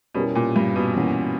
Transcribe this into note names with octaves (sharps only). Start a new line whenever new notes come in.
B2 G3 C#4 E4 G4 A#4
A#2
G2
B2
E3 A#3 C#4 F#4